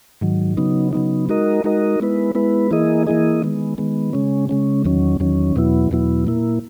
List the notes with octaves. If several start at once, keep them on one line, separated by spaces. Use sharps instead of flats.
G#2 D#3 F#3
C#3 F#3 B3 D#4
C#3 F#3 B3 D#4
G#3 D#4 F#4 A#4 D#5
G#3 D#4 F#4 A#4 D#5
G#3 B3 E4 B4
G#3 B3 E4 B4
E3 A#3 E4 G#4 D#5
E3 A#3 E4 G#4 D#5
D#3 G#3 B3
D#3 G#3 B3
C#3 G#3 C#4
C#3 G#3 C#4
E2 D#3 F#3 C#4
E2 D#3 F#3 C#4
E2 B2 F#3 B3 E4
E2 B2 F#3 B3 E4
A#2 A#3 E4